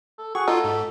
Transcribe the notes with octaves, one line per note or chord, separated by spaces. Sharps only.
A4
F#4 G#4 C#6
D#4 F4 A4
G#2